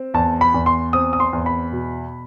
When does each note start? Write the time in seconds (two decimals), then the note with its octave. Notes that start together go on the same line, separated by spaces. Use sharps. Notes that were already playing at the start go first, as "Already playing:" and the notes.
Already playing: C4
0.14 E2 A5
0.41 B5
0.54 E2
0.66 C6
0.93 C4 D#6
1.13 D#6
1.20 C6
1.33 E2
1.46 B5
1.72 B2